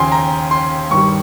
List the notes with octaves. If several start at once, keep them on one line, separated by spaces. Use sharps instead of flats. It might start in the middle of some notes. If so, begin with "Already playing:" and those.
Already playing: D#2 C#3 F3 G5 G#5 C6
A#5
C6
G2 D#3 G3 C#6